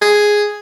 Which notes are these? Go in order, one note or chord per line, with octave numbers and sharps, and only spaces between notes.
G#4